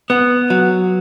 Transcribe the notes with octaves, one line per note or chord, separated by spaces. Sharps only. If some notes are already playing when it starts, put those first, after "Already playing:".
B3
F#3